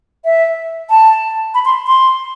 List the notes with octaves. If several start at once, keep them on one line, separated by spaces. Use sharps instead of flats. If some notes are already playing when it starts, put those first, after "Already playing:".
E5
A5
B5
C6
C6